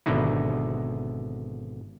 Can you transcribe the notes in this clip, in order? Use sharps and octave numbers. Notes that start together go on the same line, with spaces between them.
G#1 B2 D3 D#4 E4